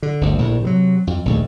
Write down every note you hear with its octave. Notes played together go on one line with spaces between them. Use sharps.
D3
G1 D2
A#1 A2
C3 D#3 F#3
F2
A#1 D#2 A3